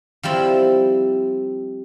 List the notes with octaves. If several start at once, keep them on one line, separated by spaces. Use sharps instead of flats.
F3 G3 C4 E4